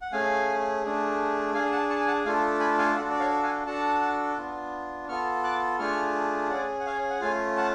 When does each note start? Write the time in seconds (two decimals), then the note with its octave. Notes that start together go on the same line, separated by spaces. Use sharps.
0.02 F#5
0.12 A3 C#4 G#4 F5 G#5
0.84 A3 D4 G#4
1.54 D4 G#4 F5 G#5
1.72 F#5 A5
1.89 A5 C#6
2.00 G#5
2.07 F#5 A5
2.25 A3 D4 F4 A4 F5 G#5
2.60 G#5 B5
2.78 F5 G#5
2.96 D4 F#4 A4 D5 F#5
3.10 D5
3.20 C#5 F5
3.43 F5 G#5
3.66 D4 F#4 A4 F#5 A5
4.38 B3 D4 F4
5.08 B3 F4 A4 C#6 F6
5.44 D6 F#6
5.79 A3 D4 F4 G#4 C#6 F6
6.50 C#4 G#4 D5 F#5
6.80 F#5
6.86 C#5 F5
7.10 F#5
7.21 A3 C#4 F4 F5 G#5
7.57 F#5 A5